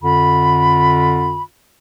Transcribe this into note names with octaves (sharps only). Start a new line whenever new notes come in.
F2 D3 F4 B5